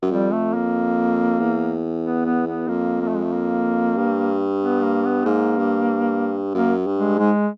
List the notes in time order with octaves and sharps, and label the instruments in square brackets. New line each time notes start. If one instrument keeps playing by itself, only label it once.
[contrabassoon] F#2
[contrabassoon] F2 [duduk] G3
[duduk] A3
A#3
[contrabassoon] E2
[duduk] B3
B3
B3
[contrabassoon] F2 [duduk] A#3
[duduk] A#3
A3
G#3
A3
A#3
[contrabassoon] G2
[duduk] B3
A#3
B3
[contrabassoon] G#2 [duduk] A#3
[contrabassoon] G2
[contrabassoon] F#2 [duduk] A#3
[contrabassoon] G2
[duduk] G#3
[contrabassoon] G#2 [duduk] G#3